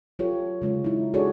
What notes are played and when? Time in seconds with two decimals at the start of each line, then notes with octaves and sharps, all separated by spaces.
0.19 F#3 F4 G4 A4 C#5
0.62 C#3 G#3 F4 C#5
0.84 D#4 E4
1.14 D4 F#4 G#4 A4 C#5 D5